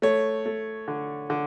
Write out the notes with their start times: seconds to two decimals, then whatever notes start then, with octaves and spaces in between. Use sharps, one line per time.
0.02 A3 C#5
0.46 A3
0.88 D3
1.30 D3